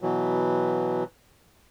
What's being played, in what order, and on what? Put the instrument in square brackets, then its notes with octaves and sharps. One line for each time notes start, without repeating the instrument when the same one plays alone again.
[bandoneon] B2 E3 F#3